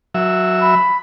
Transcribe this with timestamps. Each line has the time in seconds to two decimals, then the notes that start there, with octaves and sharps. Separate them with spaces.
0.15 F#3 E5
0.62 B5